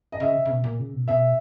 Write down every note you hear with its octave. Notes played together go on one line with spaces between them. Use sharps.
D#5
C#3 E5
C#3
B2
A#2
C#3
B2
B2 E5